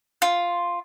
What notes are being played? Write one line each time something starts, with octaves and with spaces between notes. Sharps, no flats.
F4